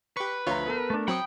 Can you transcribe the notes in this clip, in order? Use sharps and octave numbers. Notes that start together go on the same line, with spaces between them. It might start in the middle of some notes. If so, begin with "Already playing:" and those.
G4 B4 C#6
D2 F3 F4 C#5 A#5
B3 A4 A#4
A3 D4
F#3 C4 G5 B5 D#6 C#7